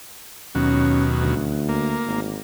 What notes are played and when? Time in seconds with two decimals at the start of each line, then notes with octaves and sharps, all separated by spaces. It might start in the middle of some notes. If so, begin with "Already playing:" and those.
0.55 D#2 B2 F#3 C#4
1.22 D2
1.69 A#3
2.07 G#1